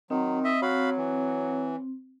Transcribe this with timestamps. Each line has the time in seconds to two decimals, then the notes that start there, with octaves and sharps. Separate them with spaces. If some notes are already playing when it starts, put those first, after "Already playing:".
0.10 D#3 F#3 C4
0.44 D#5 E5
0.62 F#3 F#4 F5 B5
0.97 E3